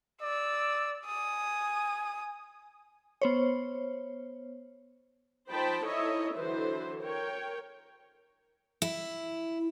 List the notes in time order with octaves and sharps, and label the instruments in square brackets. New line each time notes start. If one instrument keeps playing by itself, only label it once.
[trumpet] D5 [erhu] E6
[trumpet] G#5 [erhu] D#6
[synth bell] B3 C5 C#5
[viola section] F3 D#4 C5 G5 A5 B5
D#4 E4 A4 C#5 D#5 E5
D3 E3 F#3 B4 C5
A#4 C#5 G5
[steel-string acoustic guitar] E4